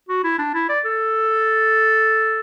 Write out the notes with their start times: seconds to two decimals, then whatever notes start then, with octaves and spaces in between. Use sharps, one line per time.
0.09 F#4
0.24 E4
0.39 D4
0.54 E4
0.69 D5
0.85 A4